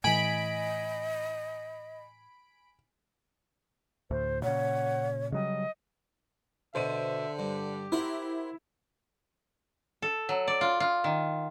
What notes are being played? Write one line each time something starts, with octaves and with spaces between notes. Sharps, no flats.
A2 E3 D#5 G#5 B5 D7
D2 A2 C5
A#2 C#3 C#5 F#5
C#3 F#3 G3 D#5
B2 D3 C5 E5 D#7
G2 G4
E4 A#4 C5 F#5
A4
F#3
D5
F4
F4
D#3